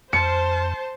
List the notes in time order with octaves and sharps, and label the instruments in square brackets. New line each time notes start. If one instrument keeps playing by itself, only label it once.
[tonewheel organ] F2 [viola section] C5 [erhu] A5 [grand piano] C#7